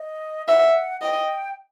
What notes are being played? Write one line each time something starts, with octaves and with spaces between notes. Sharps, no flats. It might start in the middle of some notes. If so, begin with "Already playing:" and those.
Already playing: D#5
E5 F#5
D#5 G5